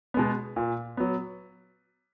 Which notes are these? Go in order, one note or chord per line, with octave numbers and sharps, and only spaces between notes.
B2 G#3 B3
A#2
F#3 B3